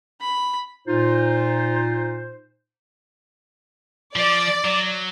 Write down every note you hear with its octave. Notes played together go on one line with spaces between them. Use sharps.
B5
A#2 D#4 F4 C5
F3 D5
F#3